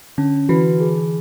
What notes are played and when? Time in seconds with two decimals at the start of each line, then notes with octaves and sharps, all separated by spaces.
0.18 D3 C#4
0.49 E3 F#4 B4
0.80 G#4